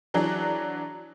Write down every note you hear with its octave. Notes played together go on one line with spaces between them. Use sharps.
E3 F#3 D4 G#4